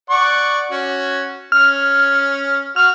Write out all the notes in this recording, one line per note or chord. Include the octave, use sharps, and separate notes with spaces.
D5 F#5 C#6
C#4 F#4
C#4 F6
F#4 F6